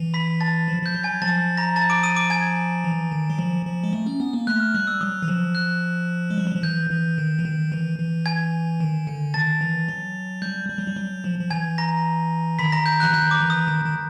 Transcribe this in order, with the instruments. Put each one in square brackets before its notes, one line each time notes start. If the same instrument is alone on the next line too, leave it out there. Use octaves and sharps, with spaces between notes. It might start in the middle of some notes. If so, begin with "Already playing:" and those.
Already playing: [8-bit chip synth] E3
[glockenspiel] B5 B6
A5 A6
[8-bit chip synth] F3
[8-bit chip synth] F3 [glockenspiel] G6
[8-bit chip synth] F#3
[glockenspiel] G#5 G#6
[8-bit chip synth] F3 [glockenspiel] A5 A6
[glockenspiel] A#5 A#6
A5 A6
D6 D7
D#6 D#7
D6 D7
G#5 G#6
[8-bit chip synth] E3
D#3
F#3
F3
F3
G#3
A3
C#4
B3
A#3
[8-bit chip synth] A3 [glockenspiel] F#6
[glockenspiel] F6
[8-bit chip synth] G3 [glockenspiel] F#6
[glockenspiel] E6
[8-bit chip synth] F#3 [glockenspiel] D#6
[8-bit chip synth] E3
F3
[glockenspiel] F#6
[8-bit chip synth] G#3
G3
F#3
F3
[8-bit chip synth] E3 [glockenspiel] G6
[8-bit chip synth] E3
D#3
E3
D#3
E3
E3
[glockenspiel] G#5 G#6
[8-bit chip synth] D#3
D3
[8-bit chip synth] D#3 [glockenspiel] A5 A6
[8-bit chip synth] E3
F#3
[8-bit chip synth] G3 [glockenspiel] G6
[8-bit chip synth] G3
F#3
G3
F#3
F3
F3
[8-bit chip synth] E3 [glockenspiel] G#5 G#6
[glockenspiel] A#5 A#6
[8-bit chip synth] D#3 [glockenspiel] B5 B6
[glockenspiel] A#5 A#6
G6
[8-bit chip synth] E3 [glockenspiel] F#6
[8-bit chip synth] D#3 [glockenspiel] G6
[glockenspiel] D6
[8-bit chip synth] E3
[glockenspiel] D#6
[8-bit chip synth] D#3
D#3